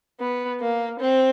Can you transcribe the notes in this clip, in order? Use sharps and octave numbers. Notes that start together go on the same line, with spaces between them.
B3
A#3
C4